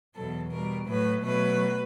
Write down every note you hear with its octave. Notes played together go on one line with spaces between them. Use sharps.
E2 B2 F#3 A4
B2 G3 A#4
A2 F#3 A3 B4
B2 F#3 A3 B4